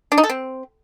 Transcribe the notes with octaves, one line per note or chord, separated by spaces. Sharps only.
D4
D#4
A4
C4